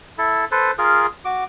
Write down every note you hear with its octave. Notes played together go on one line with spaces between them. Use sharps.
E4 A4
A4 B4 C5
F4 G#4 A#4
F#4 D6